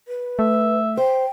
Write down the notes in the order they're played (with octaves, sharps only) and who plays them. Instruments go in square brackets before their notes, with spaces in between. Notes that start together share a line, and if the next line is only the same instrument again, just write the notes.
[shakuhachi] B4
[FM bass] A3 [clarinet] E5
[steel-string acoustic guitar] C5 [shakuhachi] G5